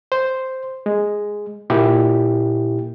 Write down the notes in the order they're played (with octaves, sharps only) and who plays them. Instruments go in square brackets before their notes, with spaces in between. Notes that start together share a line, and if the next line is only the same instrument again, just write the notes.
[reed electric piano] C5
G#3
A#2 A#3 E4 G4